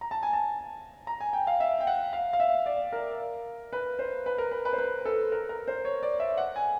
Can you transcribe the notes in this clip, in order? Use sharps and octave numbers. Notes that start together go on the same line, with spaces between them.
A#5
A5
G#5
A5
A#5
G#5
G5
F5
E5
G5
F#5
F5
F5
E5
D5
A#4
B4
C5
B4
A#4
B4
B4
C5
B4
A4
A#4
A#4
C5
C#5
D5
E5
F#5
G#5